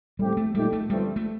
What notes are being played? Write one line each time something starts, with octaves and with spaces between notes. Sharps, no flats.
A2 G3 A3 C4 G4
A3
A#2 G3 A3 D#4 G4
A3
G1 G2 F3 G3 A3 C4
A3